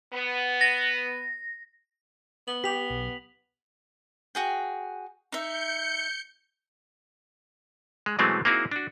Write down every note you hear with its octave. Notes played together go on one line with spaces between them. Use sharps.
B3
A#6
B3 F#7
G4 B6 F7
B1
F#4 G#4 G5
D#4 E5 G6 C#7
G#3
B2 E3 F#3 G#3 A3 C4
A#3 C4 D#4 E4 F#4 G#4
D4 F#4